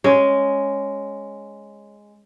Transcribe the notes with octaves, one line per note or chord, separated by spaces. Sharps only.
G#3 C#4